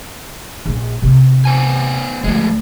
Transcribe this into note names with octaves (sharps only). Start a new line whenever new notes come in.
A#1
C3
B3 C5 G#5
D2 F3 G#3